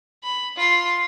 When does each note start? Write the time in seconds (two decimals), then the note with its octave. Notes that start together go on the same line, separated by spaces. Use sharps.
0.23 B5
0.56 F4 C6